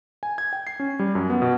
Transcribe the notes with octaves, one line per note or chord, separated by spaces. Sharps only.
G#5
G#6
G5
C7
C#4
G3
F#2
B3
B2